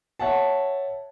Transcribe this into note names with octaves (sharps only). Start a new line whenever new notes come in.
C#5 E5 F#5 A5